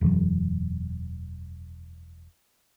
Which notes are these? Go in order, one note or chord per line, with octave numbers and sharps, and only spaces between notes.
E1 F#2 E3 F#3